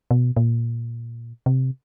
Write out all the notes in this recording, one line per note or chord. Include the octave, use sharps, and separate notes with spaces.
B2
A#2
C3